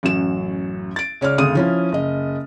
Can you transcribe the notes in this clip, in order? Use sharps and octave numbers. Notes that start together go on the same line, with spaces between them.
A1 F#2 F#3 E7
A6 D7
C#2 C#5 D5 F6
G#1 D2 C#3 D#6 D#7
F3 C#4 E4
F#1 D#5